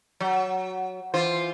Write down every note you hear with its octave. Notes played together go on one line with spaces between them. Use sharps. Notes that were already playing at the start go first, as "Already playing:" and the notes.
F#3
E3 F4 C5